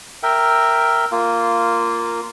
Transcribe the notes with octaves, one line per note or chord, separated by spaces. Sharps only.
A#4 E5 G5
A#3 F4